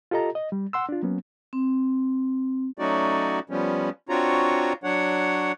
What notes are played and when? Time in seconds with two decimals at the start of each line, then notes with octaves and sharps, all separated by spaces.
0.11 F4 G4 A4 D#5 A#5
0.35 D#5
0.52 G3
0.73 F#5 C6 E6
0.89 D4 F4
1.03 F#3 A#3 B3 C#4
1.53 C4
2.78 F#3 A3 C#4 D#4 F#4 D5
3.50 F3 G3 B3 C#4
4.09 C4 D4 F4 F#4 C#5 A#5
4.84 F#3 D4 C#5 F#5